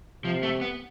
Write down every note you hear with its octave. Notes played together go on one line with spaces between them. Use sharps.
C3 F3
A3
B3